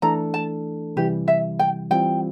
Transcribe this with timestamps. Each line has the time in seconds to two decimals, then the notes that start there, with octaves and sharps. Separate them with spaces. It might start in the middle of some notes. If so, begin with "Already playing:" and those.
0.02 E3 A3 D4 A4 A#5
0.34 A5
0.96 C3 E3 G3 G4
1.28 E5
1.59 G5
1.91 E3 G3 C4 F4 G5